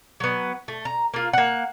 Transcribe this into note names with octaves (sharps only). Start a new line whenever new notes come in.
F#3 B3
A3
A#5
A#3 F4
A#3 F#5